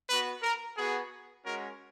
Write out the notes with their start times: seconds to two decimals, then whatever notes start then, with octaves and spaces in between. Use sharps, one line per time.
0.09 B3 F#4 B4
0.43 A#4
0.77 B3 F#4 G#4
1.45 G#3 C#4 F#4 A#4